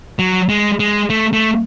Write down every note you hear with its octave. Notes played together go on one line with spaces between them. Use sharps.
F#3
G#3
G#3
A3
A3